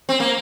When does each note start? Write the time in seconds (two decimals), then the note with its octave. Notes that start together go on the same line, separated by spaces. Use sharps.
0.09 C4
0.20 A#3